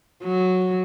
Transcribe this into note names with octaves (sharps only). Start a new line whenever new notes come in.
F#3